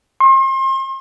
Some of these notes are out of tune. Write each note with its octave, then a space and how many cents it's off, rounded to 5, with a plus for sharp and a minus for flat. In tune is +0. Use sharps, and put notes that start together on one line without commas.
C6 +35